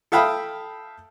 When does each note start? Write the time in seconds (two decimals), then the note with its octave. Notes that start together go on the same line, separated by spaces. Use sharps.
0.12 A4 E5 F5 G5 B5 D#6